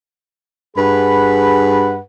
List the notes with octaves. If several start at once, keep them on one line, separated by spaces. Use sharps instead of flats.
G2 G#4 B4 F#5 B5